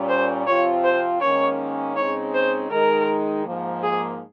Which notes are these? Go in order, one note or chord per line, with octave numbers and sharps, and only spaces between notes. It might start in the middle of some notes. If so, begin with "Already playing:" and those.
Already playing: A#2 G3 C#4
C5
C3 F3 C4 F4 C#5
C5
G#2 D#3 A#3 C#4 C#5
C#3 G#3 C4 D#4 C#5
C5
D#3 G#3 D#4 A#4
G#2 F3 A#3
G#4